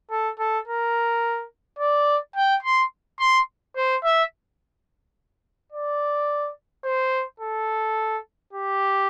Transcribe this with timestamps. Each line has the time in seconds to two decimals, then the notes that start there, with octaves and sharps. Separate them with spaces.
0.11 A4
0.39 A4
0.67 A#4
1.79 D5
2.36 G5
2.63 C6
3.19 C6
3.76 C5
4.04 E5
5.72 D5
6.85 C5
7.40 A4
8.53 G4